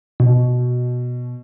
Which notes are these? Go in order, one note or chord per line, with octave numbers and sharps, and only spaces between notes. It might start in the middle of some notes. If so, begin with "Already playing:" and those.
B2